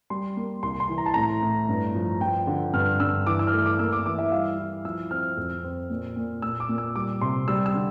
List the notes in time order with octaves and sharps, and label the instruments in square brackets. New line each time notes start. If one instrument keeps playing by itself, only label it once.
[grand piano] G3 C6
A#3
C2 C6
C6
E3
A#5
A5
A2 A#5
A2
G2
F3
F3 G5
D3
G2 F6
G2 E6
E3 D6
E6
F6
A3 E6
D6
A#3 E6
D6
E3 D6
E5
G3 F5
E4
F3 E6
C4 F6
F2
C4
A#2
A#2
A#2 E6
D6
A#2
E6
G3 D6
C3 C6
G3 E6
E6
D3